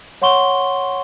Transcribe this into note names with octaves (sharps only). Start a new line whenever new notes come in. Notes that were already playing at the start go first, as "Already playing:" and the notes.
C#5 F#5 C6 C#6 G7